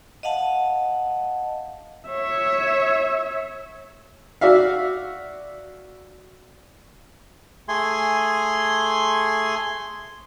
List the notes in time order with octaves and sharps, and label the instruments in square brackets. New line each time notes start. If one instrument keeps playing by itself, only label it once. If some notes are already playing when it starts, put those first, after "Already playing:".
[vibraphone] D#5 F5 F#5 A5
[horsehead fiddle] C#5 E5
[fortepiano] F#4 D5 E5 F5
[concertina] A3 G#4 G#5 C6